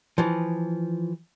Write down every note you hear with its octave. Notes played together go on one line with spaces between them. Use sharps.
E3 F3